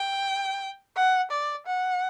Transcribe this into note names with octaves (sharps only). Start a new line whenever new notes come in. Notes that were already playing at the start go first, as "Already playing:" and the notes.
Already playing: G5
F#5
D5
F#5